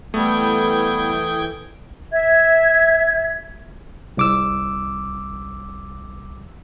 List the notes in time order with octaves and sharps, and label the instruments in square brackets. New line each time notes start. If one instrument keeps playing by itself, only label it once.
[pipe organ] E3 G5 G#6 [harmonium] G3 B3 [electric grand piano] A3 [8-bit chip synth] A4 D#6
[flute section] E5 G#6
[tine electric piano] C2 D6 E6